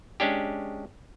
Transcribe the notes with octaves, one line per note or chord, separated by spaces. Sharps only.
G#3 C#4 D4 G4